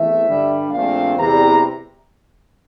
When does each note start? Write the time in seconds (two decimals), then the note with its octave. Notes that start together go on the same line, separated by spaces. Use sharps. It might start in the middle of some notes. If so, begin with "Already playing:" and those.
Already playing: E2 E3 A3 C4 E5
0.26 G2 D3 G3 D4
0.71 A#1 A#2 A3 C4 F5
1.17 E2 C3 G3 A#5